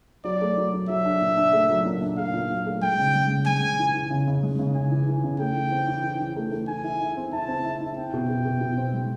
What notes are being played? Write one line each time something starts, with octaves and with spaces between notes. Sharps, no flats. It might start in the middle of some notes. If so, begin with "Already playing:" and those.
F#3 D5
A3
F#3
F#3
F#3 E5
D4
A#2
D4
A3
F#3
A#2
D4
A3 F5
A#2
F#3
A3
G#3 G5
C#3
G#3
C#3
G#3 G#5
C#3
E3
E3
C#3
C#3
G#3
C#3
C#3 G#5
E3
E3
C#3
A3 G5
E3
C4
E3
E3
E3
A3
A3
E3 G#5
E4
E4
C4
E4 A5
C4
E4
E4
C4 G5
B2
B2
B2
B2
C4
G#3